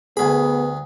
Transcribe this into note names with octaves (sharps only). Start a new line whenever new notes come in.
D2 B3 G#4 B5